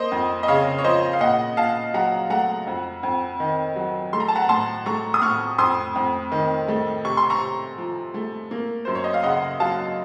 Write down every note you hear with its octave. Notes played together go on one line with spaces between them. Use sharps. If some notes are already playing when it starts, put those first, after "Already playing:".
Already playing: A#3 C5 D#5
F2
D#5
C#3 C#5 F5
C#5
F3 C5 D#5
F5
A#2 D#5 F#5
A#2 F5 A5
F#3 F#5 A#5
A3 F#5 A#5
F2
F2
D#3
F#3
A3 C6
A#5
A5
F#5 A#5
A2 A5 C6
A3 A#5 C#6
D#6
A2 C#6 F6
F2 C6 D#6
F2
D#3
A3
C3 C#6
C6
A#5 C#6
C3
F3
A3
A#3
F#2 C5
C#5
D#5
F5
C#3 D#5 F#5
F#3 F5 A5